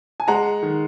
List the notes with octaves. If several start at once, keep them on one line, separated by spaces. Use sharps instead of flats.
G#5
G#3 F#5 A#5
D#3